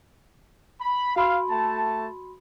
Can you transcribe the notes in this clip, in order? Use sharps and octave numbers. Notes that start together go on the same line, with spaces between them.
B5
F#4 F5 B5 C6
A3 A5